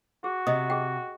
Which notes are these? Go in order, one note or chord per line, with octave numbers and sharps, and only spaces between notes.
F#4 G#4
C3 D#5 D#6
G#4 G5